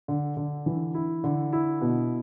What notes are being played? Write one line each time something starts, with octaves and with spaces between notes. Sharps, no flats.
D3
D3
E3
E4
D3
E4
B2